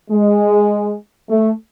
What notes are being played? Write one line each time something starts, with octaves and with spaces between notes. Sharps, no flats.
G#3
A3